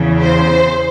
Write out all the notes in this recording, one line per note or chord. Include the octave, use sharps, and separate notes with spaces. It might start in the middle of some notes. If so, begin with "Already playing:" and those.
Already playing: E2 C#3 E3
C5